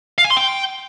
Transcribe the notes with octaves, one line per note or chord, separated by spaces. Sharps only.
F5
G#5
C6
G5